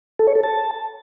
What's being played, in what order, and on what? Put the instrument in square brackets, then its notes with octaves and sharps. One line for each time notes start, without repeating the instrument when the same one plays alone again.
[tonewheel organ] A4
C#5
A4
A5